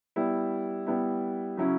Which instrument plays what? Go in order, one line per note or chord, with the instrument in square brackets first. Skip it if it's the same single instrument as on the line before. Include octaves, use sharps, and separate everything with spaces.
[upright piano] G3 B3 E4
G3 B3 E4
C#3 F#3 C#4 E4